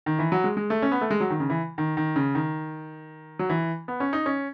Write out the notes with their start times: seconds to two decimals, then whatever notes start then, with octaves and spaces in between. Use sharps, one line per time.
0.06 D#3
0.19 E3
0.32 F#3
0.44 G#3
0.57 G#3
0.70 A3
0.82 C#4
0.91 B3
1.01 A3
1.11 G#3
1.20 F#3
1.30 D#3
1.40 C#3
1.50 E3
1.78 D#3
1.97 D#3
2.16 C#3
2.35 D#3
3.39 F#3
3.50 E3
3.88 B3
4.00 C#4
4.13 D#4
4.26 C#4